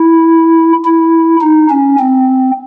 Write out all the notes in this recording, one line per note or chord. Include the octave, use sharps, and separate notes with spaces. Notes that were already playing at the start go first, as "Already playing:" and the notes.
Already playing: E4
E4
D#4
C#4
C4